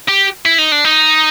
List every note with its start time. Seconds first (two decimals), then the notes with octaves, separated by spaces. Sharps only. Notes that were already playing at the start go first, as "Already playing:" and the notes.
0.08 G4
0.46 E4
0.58 D#4
0.72 D4
0.85 D#4